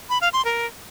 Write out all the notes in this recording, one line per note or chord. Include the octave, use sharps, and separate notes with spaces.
B5
F5
C6
A#4